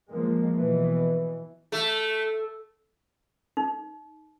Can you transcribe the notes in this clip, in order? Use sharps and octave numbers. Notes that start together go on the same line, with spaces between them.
F3 G#3 A#3
B2 E3
A3
D#4